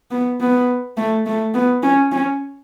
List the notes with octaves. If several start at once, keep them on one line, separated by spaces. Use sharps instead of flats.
B3
B3
A3
A3
B3
C#4
C#4